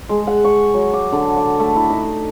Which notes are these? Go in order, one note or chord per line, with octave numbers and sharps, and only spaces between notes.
G#3
F#5
C#6
F#3
D6
D3
D6
A3
E4
D#4